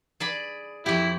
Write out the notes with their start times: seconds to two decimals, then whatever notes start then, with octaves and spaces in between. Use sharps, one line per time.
0.20 G#4 D5 B5
0.86 F2 E4 G4